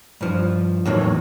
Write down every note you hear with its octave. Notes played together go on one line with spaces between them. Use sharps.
G2 F3
E2 A2 D#3 F#3